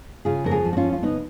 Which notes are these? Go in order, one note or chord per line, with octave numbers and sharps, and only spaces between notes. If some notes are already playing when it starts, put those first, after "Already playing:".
C#3 F4 G#4
F2 A#4
F4 G#4
F3
F#4
C#4 F4
F2
F4
C#3 B3 D#4